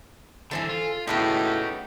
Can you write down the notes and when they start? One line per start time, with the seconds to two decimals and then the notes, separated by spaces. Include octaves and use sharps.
0.51 D3 E3 A4 C5 G#5
0.69 F4
1.07 A2 C#3 B3 D#4 F#4 G4